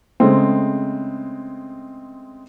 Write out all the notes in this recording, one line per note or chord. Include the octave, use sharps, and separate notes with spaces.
C#3 G#3 A3 C4